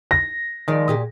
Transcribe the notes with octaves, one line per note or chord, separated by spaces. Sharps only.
A#6
D#3 F3 G#3 D5
A#2 G4 G#4